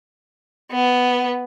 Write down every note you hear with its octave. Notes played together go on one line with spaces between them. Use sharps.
B3